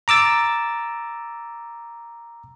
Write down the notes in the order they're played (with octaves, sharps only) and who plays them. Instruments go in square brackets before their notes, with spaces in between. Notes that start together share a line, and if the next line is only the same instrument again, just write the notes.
[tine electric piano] A#5 D6 E6 A6